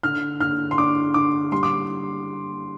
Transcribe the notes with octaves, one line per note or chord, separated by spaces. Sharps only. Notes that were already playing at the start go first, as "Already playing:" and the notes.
D3 F6
D3 F6
C6
D4 D6
D3 D6
G3 C6
D6